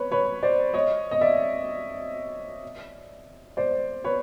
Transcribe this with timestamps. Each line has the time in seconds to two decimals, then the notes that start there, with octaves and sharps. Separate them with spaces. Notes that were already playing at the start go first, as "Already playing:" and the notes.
Already playing: B4 C#5
0.11 B4 C#5
0.43 C5 D5
0.74 C#5 D#5
1.11 D#5
1.21 D5 E5
3.57 C5 D5
4.04 B4 C#5